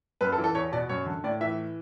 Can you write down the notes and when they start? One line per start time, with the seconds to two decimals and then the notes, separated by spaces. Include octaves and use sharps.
0.21 F#2 B4
0.32 A4
0.38 E3
0.44 A4
0.55 E2 C#5
0.72 B2 D5
0.89 F#2 C#5
1.06 D3
1.24 A2 D5
1.41 E3 E5